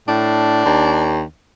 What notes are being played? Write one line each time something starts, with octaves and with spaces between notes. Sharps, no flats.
A2 D4
D#2